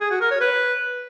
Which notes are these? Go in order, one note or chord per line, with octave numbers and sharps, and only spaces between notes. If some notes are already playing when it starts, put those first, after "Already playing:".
G#4
F#4
A#4
C#5
B4